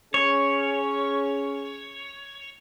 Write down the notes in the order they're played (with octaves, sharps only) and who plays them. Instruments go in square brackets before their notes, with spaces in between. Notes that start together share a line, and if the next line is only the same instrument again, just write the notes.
[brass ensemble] C#4 G#4 [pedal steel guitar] C#5